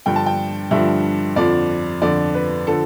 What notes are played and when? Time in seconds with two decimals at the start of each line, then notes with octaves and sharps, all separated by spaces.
0.06 G2 D3 F3 G5
0.16 A5
0.26 G5
0.71 G2 D3 F3 E5
1.36 F2 D3 F3 D5
2.02 F2 D3 F3 D5
2.34 B4
2.67 D3 F3 A4